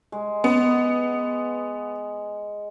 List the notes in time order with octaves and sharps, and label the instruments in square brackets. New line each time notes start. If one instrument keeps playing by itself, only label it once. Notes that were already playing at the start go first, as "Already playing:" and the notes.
[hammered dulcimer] G#3
[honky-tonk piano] B3